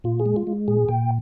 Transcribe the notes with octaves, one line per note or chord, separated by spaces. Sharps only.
A#2 F4
G#4
G#3
F4
G#3
A#2 G#4
A#2 G5